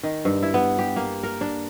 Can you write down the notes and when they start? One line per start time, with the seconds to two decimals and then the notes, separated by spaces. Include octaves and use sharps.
0.03 D#3
0.25 G2
0.42 E4
0.54 B3
0.79 G4
0.96 A#3
1.23 A#4
1.41 D4